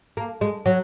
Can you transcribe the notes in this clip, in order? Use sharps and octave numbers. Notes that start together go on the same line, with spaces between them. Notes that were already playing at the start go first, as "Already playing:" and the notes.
A#3
G#3
F#3